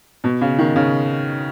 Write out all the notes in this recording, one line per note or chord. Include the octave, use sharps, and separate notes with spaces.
B2
C#3
D#3
C#3